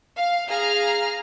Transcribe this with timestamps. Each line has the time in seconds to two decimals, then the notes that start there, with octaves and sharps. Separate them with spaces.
0.18 F5
0.49 G#4 F5 A#5 F6